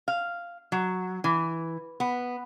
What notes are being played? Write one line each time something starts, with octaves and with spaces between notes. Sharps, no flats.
F5
F#3
E3
B3